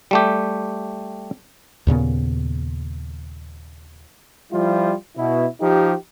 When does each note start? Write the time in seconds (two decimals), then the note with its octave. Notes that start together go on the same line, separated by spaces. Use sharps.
0.11 G3 A3 G4
1.87 D#2 A#2 C#3 B3
4.52 F3 G3 E4 F4
5.16 B2 E4
5.61 F3 D#4 G4